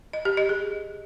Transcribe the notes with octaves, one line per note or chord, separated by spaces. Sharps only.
D#5
G4
D#5
G#4